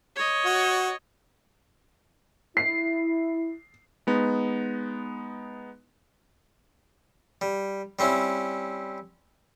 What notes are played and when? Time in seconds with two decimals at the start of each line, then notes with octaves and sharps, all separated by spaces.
0.16 C#5 D#5
0.45 F#4
2.57 E4 C7
4.07 G#3 B3 D#4
7.41 G3
7.99 G3 C4 C#4 E4